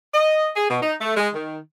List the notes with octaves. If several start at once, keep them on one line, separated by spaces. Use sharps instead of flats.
D#5
G#4
B2
D#4
A3
G#3
D#3